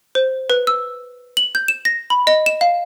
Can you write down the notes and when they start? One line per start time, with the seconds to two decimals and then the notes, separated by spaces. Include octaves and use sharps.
0.15 C5
0.50 B4
0.67 E6
1.37 F#7
1.55 G6
1.68 E7
1.85 A#6
2.10 B5
2.27 D#5
2.46 E7
2.61 F5